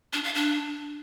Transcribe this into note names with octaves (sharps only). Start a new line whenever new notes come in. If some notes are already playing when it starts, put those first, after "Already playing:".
D4
F5
D4